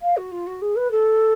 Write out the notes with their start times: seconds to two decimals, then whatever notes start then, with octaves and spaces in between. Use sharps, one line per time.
0.02 F5
0.16 F#4
0.31 F4
0.46 F#4
0.61 G#4
0.75 B4
0.91 A4